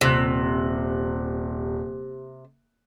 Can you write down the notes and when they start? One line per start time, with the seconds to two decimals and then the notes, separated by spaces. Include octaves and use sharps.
0.01 D#1 C3 F#6